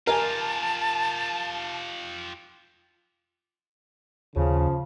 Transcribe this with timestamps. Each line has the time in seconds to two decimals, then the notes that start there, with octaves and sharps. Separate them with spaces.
0.07 F4 G4 A#4 G#5 A5
4.36 D#2 C#3 F3